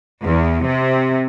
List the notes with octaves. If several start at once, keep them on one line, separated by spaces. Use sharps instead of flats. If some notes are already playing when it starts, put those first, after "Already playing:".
E2
C3